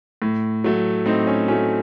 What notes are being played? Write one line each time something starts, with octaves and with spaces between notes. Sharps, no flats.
A2
F#3 A3
A2 C4 D#4
C#4
F#3 A3 C#4